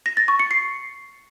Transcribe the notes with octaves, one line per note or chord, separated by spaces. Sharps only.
A#6
A6
C#6
C#7
C7